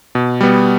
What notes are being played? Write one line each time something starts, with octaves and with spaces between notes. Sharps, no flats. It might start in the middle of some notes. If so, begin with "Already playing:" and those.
B2
G3 B3